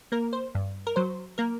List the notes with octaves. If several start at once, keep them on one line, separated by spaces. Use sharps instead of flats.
A#3 A#4
C5
G2
A#4
F#3 C5
A#3 A#4